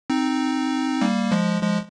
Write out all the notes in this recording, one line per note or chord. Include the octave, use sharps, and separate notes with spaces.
C4 D#4
G3 A#3
F3 G#3
F3 G#3